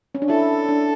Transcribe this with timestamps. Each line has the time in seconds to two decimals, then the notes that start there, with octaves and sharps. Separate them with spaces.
0.15 C#4
0.22 D4
0.29 E4 A4
0.68 D4